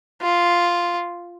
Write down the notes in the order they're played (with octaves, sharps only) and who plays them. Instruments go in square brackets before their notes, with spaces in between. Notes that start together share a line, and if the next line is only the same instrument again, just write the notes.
[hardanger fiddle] F4